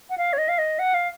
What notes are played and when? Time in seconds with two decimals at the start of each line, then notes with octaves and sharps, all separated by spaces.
0.10 F#5
0.18 F5
0.33 C#5
0.38 D#5
0.49 F5
0.58 D#5
0.79 F#5
0.94 F5